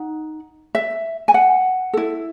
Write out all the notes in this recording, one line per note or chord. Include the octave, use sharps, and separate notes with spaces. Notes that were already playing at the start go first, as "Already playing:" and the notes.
Already playing: D#4 F#5
E5
G#5
F#5
E4 A4